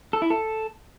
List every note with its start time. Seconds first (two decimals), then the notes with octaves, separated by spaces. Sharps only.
0.13 A4
0.22 E4
0.30 A4